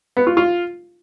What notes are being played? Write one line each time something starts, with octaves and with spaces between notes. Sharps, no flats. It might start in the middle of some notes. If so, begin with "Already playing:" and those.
B3
F4
F4